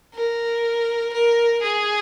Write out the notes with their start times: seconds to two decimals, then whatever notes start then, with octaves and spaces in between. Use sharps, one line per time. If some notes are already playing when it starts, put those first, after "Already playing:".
0.15 A#4
1.13 A#4
1.62 G#4